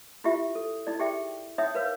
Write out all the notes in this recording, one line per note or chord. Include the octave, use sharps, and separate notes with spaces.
E4 F4 G4 E5
A4
D#4 E4 D5
G4 G#4 E5 G5
D#4 C#5 E5 F#5 G5 D#6
A#4 B4 C#5 F5